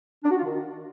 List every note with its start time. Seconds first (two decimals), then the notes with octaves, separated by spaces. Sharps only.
0.24 D4
0.31 F#4
0.37 F4
0.44 D#3